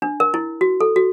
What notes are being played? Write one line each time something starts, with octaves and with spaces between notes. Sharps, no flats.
D4
A#4
E4
F#4
A4
F#4